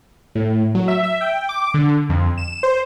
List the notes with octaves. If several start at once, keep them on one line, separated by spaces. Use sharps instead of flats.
A2
F#3
E5
E5
G5
D6
D3
F2
E7
C5